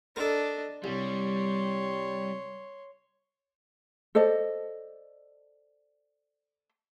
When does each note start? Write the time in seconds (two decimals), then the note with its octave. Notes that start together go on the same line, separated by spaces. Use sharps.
0.16 D4 A4 A#4 D#5
0.84 C2 G3 C#5 C6
4.15 A4 C5 D5 D#5